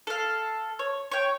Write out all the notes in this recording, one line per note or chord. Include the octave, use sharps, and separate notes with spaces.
A4 F5
C#5
C#5 G5